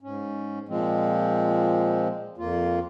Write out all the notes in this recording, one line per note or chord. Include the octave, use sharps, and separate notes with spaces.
G#2 C#4
A#2 F3 G#3 C4
F2 A#3 F4